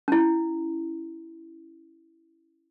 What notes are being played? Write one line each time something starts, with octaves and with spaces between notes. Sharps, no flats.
C#4 E4